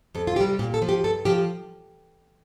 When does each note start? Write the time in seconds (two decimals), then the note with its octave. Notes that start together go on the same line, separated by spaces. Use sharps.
0.15 F2 A4
0.27 F4
0.36 C3 G3 G4
0.59 A#2 G4
0.74 A4
0.82 F3
0.89 G4
1.04 G2 A4
1.25 F3 G4